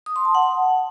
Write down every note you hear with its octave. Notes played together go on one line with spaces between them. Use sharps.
D#6
C6
A5
F#5